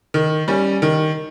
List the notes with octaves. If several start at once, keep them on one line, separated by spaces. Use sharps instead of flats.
D#3
G3 C#4
D#3